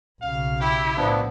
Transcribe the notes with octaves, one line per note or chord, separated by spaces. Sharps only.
B1 C#3 F5
E4 G4
A2 F3 B3 D4